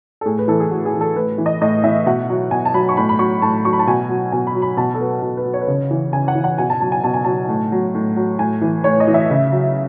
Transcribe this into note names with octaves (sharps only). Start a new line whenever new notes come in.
A4
A2 G#4
B4
E3 A4
G#4
A2 F#4
G#4
E3
A4
A2 B4
E3
D#5
A2 D#5
E3 E5
B2 F#5
F#3
B2 G#5
A5
F#3 B5
C#6
A2 B5
B5
F#3 C#6
A2 A5
F#3 C#6
B5
A5
B2 G#5
F#3
B2 G#5
B5
F#3
B5
B2 A5
A4
F#3 B4
B2 A4
B4
F#3
C#5
B4
C#3 C#5
E3
C#3 G#5
F#5
E3
F#5
B2 G#5
A5
F#3 A5
G#5
B2 A5
G#5
F#3 A5
A2
F#3
A2
F#3
A2 G#5
E3
A2 C#5
D#5
E3
E5
C#3
F#3